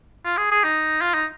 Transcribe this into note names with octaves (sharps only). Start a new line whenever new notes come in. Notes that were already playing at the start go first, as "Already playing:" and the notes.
F4
G#4
G#4
D#4
F4
D#4